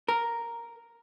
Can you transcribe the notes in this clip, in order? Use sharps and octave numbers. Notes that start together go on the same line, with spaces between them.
A#4